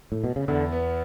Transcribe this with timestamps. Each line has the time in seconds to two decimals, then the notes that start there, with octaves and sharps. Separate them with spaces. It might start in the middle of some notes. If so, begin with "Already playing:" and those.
0.12 A2
0.24 B2
0.36 C#3
0.48 E2 D3
0.72 B3